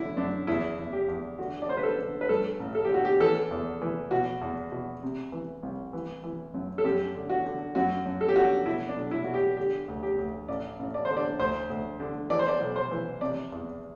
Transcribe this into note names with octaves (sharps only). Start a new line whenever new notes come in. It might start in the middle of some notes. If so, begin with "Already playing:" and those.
Already playing: D3 E4
F#2 D4
E2 E4
E2
G4
E2
D3 F#4
D5
D3 C5
B4
A4
D3
B4
G2 A4
A1
A4
G4
D3 F#4
G4
E3 A4
E2
E3
B2 F#4
E2
B2
C3
E3
C2
E3
E3
F#2
A4
F#2 G4
D3
F#4
D3
F#2 F#4
F#2
A4
G4
D3 F#4
G4
B2 E4
D4
B1
E4
B2 F#4
G4
D3 G4
D2
G4
D2
A1 D5
A1
D5
D3 C5
D5
D2 C5
D2
D3
E3 D5
C5
D5
B1
C5
E3
C3 D5
E2